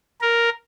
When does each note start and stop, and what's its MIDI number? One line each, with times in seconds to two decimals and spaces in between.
0.21 0.49 70